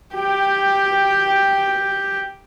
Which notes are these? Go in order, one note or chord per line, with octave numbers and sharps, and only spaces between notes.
G4 G5